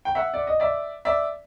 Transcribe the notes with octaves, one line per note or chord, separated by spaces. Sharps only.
G5
E5 F#5
D5
D#5
D5 E5
D5 E5